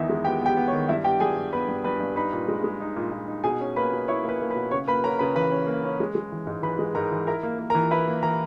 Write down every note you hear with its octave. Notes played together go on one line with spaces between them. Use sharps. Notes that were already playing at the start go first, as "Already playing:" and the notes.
Already playing: E2 D#3 B3 D#4 E4 E5
G#3
B3 G4 G5
B3 G4 G5
B3
C#5
D#3
G2 E4 E5
B3 G4 G5
G2 G#4 G#5
G3
B3 B4 B5
G2
G2 B4 B5
G2
D#4 B4 B5
A#2
G#3
G#3
D#4
A#2
A#2
D#4
B2 G#4 G#5
C#4
A#3 B4 B5
B2
E4 C#5 C#6
A#3
B4 B5
A#3
B4 B5
B2
C#3 C#5 C#6
A#3 B4 B5
C#4 A#4 A#5
C#3 B4 B5
E3 B4 B5
C#4
A#3
C#4
G#3
G#3
E3
G#2
E3 B4 B5
G#3
G#2 A#4 A#5
E3
E4 A#4 A#5
A#3
A#3
A#4 A#5
E3
E4 B4 B5
A#3
E3 A#4 A#5